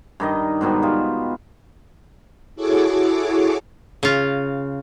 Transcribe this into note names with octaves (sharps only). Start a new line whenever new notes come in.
G2 D#3 D#5
G#2 B2 D#3 G3
G3 F4
E4 F#4 G#4 A4 C#5 D6
C#3 F4